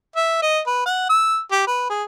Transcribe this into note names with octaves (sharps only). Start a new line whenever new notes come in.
E5
D#5
B4
F#5
E6
G4
B4
G#4